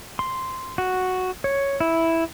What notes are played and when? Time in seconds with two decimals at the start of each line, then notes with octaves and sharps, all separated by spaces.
0.19 C6
0.78 F#4
1.44 C#5
1.80 E4